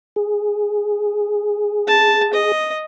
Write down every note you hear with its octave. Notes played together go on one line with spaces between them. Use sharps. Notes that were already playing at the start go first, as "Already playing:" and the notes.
G#4
A5
D#5